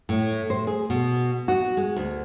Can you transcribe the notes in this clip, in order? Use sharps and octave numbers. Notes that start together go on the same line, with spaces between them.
A2
C5
G#4
B2
F#4
G#3
D2